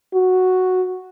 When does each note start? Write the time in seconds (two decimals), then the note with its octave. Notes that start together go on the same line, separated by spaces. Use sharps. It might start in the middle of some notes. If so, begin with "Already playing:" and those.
0.14 F#4